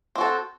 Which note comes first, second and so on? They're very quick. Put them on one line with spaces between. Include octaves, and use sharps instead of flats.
C4 F#4 A4